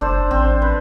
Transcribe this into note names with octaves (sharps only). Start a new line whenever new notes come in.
F#1 D4 A4 C5
A1 C4
B4